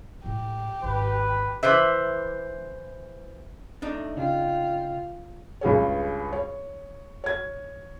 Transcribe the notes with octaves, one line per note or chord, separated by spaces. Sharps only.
A2 G#3 G4
G#1 B4
E3 B4 C5 E5
A3 D4 D#4
C#3 F4 G5
C#2 G2 G#4 C#5
C#5
C#5 G#6